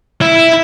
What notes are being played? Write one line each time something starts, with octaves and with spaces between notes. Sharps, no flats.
E4